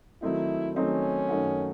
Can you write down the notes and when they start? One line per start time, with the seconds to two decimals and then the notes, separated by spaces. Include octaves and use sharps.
0.22 D#3 F#3 A3 C4 D#4 E4
0.76 D#3 F#3 A3 C4 C#4 D#4
1.28 F#2 D#3 A3 D#4 F#4